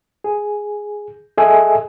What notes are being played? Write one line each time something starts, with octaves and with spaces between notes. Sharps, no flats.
G#4
G#4 A4 D#5 E5 G#5